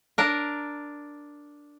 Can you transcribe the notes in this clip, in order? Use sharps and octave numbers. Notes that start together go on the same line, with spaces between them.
D4 A#4